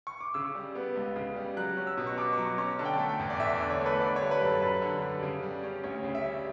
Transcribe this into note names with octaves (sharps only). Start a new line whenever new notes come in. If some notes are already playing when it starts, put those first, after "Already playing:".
C#6
D6
C#3 E6
G3
B3
C#2
C#3
G3
F#3 F#6
C#4
E6
B2
C#6
B2 D6
C#6
F#3 D6
C#4 C#6
D3 A5
G5
A5
A3
G5
E2
D5
E2 E5
D5
D3
C#5
A3 B4
D3 D5
C#5
G3
B4
F#2 A4
F#2 B4
D3
G3
C#3
G3
C#4
D2 C#5
C#3
E5
G3